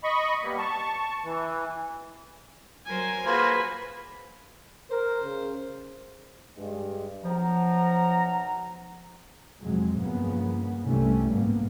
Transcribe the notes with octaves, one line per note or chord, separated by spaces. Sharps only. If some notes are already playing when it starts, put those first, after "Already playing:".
D#5 B5 C#6
G3 A#3 B3
A5 C#6
E3
F#3 A#4 C5 G#5
A#3 F4 F#4 G#4 B4 C5
A#4 C5
C#3
G2 G#3
B1 F3 F#5 A#5
F2 C3 F#3 G#3
G2 C#3 F3 A#3 B3
C2 C3 E3 G3 A3 C#4
G1 G#2 A#3 B3